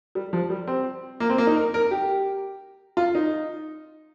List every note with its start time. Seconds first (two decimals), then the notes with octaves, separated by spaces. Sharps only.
0.15 G3
0.33 F3
0.50 G3
0.67 C4
1.20 A#3
1.30 C4
1.38 A#3
1.47 D#4
1.56 A#4
1.74 A#4
1.91 G4
2.97 F4
3.15 D#4